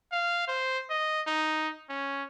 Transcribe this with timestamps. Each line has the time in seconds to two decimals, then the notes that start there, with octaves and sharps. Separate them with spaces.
0.12 F5
0.48 C5
0.90 D#5
1.27 D#4
1.89 C#4